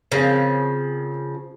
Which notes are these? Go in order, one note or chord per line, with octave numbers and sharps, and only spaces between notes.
C#3 F3 C4 G#4 A#4